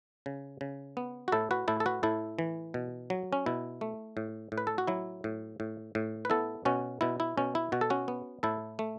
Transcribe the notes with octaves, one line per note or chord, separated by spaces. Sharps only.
C#3
C#3
B3
F#4
A2 E4 A4
F#4 B4
A2 E4 A4
A4
F#4 B4
A2 E4 A4
E3
B2
F#3
C#4
B2 E4
A3
A2
A2
B4
A4
F#4
F#3 E4
A2
A2
A2
B4
B3 E4 A4
B2 C#4 F#4
B2 E4
E4
B2 C#4
E4
B2 F#4
A4
C#4 F#4
B3
A2 E4 A4
A3